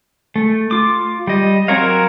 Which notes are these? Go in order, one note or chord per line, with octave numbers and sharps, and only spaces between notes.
A3
F4 D6
G3 D#5
F#3 C4 A#4 C#5 F5